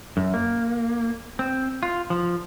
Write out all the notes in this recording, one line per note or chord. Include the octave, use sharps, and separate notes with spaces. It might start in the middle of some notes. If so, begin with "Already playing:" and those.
F#2
A#3
C4
F4
F3